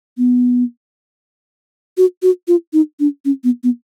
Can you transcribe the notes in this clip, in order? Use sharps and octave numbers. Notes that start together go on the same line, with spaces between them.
B3
F#4
F#4
F4
D#4
D4
C#4
B3
B3